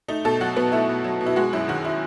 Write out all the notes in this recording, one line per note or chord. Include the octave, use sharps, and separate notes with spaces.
A3 D#4
B2 A4
F#3 F#4
B2 B3
A3 E4
B2
F#3
B2
E4
G#3 F#4
F#2 E4
D#3 F#4
E4